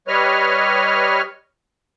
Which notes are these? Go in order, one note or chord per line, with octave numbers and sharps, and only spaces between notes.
G3 B4 C#5 D#5 F6